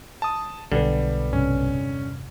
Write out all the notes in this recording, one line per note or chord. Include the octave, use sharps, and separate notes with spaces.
A5 D#6
B1 B2 D3 G3 B4
E1 G2 C3 C#4